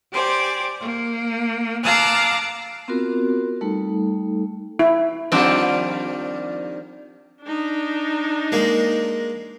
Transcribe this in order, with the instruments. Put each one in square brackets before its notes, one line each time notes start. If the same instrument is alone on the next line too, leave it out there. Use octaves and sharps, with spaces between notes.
[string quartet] G4 C5 D5 G#5
A#3
F5 A5 A#5 D6 E6 F#6
[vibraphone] B3 C4 F4 F#4 A#4
G3 A3 D#4 A4
[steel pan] E4
[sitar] D#3 F3 G3 [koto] C4 D4
[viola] D4 D#4
[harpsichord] G#3 A#3